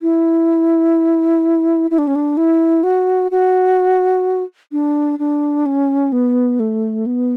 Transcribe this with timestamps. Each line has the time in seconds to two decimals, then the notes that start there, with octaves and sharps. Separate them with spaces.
0.02 E4
1.91 E4
1.98 D4
2.07 C#4
2.15 D4
2.37 E4
2.83 F#4
3.31 F#4
4.72 D4
5.19 D4
5.66 C#4
6.12 B3
6.60 A3
7.06 B3